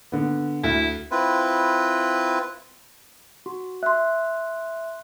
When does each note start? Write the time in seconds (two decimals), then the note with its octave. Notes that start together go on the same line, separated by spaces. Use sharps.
0.12 D3 B3
0.63 D2 E4
1.11 C4 E4 F4 B4
3.46 F#4 C6
3.83 E5 C6 F#6